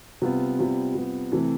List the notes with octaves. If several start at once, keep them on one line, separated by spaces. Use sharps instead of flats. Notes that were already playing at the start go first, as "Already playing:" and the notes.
C3 G3 B3 F4
C3 G3 B3 F4
C3 G3 B3 F4
C3 E3 A3 C4